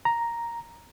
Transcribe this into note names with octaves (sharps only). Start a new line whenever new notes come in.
A#5